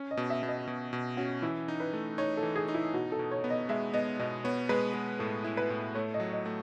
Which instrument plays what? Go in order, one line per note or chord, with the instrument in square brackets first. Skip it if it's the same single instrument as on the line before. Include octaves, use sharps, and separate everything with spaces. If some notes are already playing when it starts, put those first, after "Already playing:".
Already playing: [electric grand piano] C#4
[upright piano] D#5
[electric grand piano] B2
[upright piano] E5
[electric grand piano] B2
[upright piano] D#5
[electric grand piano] B2
B2
[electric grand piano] C#4 [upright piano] F#4
[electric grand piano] E3 [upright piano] E4
[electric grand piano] D#4
[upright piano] B4
[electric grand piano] A3
[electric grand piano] D#4 [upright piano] C#5
[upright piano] A4
[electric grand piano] E3
[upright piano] G#4
[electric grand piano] D#4
[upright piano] E4
[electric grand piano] B2 [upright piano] F#4
[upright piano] A4
[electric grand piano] B2
[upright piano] C#5
[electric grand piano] B3
[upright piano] D#5
[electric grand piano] G#3 [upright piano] E5
[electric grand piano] B3 [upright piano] D#5
[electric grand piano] B2 [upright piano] D#5
[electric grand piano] B3 [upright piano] C#5
[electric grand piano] G#3 [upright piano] B4
[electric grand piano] G#3
[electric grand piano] A2 [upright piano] A4
[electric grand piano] E4
[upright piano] B4
[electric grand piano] A2
[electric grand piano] A3 [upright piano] C#5
[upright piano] D#5
[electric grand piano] F#3
[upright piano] D#5
[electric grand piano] A3